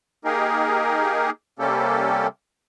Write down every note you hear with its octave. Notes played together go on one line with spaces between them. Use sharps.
A#3 D#4 G4 G#4 A#4
C3 G3 A#3 C#4 G4 A4